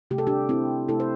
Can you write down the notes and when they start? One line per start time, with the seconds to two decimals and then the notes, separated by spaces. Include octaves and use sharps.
0.11 C3 A3 G4
0.18 A4
0.27 D4 G4
0.49 C4 E4
0.89 C3 A3 E4 A4
1.00 C5